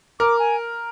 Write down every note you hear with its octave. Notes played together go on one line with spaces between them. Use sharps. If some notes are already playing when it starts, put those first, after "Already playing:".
A#4 D6
G#5